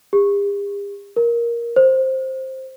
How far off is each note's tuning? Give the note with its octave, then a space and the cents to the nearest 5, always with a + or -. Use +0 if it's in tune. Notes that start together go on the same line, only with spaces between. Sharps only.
G4 +45
A#4 +10
C5 +10